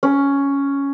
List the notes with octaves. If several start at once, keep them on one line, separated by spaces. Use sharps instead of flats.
C#4